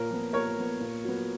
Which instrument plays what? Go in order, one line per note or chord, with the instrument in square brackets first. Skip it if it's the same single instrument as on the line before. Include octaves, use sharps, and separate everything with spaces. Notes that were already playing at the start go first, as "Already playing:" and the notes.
Already playing: [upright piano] A#2 A#4 C#5
F3 B3
A#2 A#4 C#5
F3 B3
A#2
F#3 B3